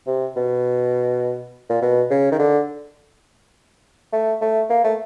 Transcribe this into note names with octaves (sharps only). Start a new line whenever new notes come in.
C3
B2
A#2
B2
C#3
D#3
D3
A3
A3
A#3
A3